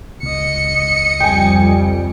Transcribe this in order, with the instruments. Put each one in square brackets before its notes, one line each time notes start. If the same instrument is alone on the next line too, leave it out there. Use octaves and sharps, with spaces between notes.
[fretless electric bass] C#2 [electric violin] D#5 C#7
[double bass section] F2 G3 [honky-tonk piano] G5 G#5